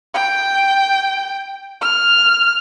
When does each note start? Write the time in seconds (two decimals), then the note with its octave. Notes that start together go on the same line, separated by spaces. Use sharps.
0.14 G5
1.81 F6